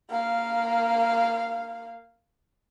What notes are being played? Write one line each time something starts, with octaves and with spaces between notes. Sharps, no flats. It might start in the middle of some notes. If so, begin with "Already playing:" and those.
A#3 F5